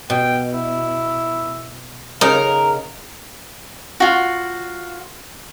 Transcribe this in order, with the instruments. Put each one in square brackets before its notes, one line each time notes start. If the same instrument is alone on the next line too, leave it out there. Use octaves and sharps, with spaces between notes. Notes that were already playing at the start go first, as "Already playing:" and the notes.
[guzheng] B2 [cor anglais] G5
[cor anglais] E4
[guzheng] C#3 D#4 [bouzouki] A#4 [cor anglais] F5
[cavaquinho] F4 F#4